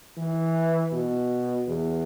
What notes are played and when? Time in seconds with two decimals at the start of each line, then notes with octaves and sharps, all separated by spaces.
0.17 E3
0.93 B2
1.68 E2